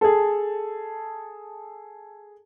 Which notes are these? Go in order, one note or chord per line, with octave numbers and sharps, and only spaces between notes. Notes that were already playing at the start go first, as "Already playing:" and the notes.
G#4 A4